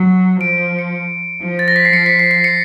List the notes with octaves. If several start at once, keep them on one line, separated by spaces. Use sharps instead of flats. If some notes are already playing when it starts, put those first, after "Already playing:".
Already playing: F#3
F3 D7
C#7
F3
A6
A#6
B6
C7
F3 C#7
B6
C7
C7
C#7